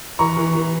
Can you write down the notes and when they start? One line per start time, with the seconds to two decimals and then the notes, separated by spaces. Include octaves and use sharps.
0.19 E3 A#5 C#6
0.37 E3
0.55 E3